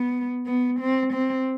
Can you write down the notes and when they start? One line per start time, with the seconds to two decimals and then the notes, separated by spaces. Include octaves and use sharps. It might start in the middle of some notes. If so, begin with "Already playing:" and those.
Already playing: B3
0.47 B3
0.80 C4
1.13 C4